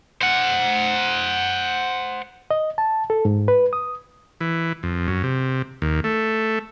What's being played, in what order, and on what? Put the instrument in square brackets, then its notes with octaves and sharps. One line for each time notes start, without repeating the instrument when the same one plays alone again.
[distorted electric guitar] C5 F#5
[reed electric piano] D#5
A5
A4
G#2
B4
D#6
[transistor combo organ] E3
F2
F#2
C3
D#2
A3